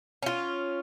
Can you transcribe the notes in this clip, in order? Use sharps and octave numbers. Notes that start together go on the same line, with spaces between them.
C#4 F4